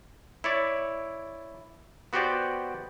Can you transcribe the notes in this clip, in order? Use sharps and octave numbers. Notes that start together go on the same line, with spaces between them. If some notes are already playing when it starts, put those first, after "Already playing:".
E4 C#5 D5
B3 F#4 G4 C5 D5 G5